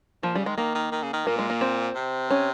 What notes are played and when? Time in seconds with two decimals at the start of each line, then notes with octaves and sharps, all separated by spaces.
0.23 A#2 F3
0.34 C#3 G3
0.46 D#3 G#3
0.57 D#3 A#3
0.75 D#3
0.92 D#3
1.03 C#3
1.14 D#3
1.27 A#2 A#3
1.38 G#3
1.50 A#3
1.61 C4
1.96 C3
2.30 C#4